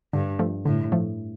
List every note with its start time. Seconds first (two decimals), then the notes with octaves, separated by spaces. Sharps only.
0.13 G2 D3
0.39 F3 A3
0.65 A2 D3
0.92 F3 A3